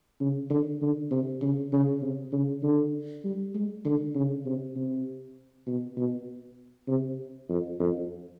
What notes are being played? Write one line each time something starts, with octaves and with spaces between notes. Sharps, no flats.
C#3
D3
D3
C3
C#3
C#3
C3
C#3
D3
G3
G#3
D3
C#3
C3
C3
B2
B2
C3
F2
F2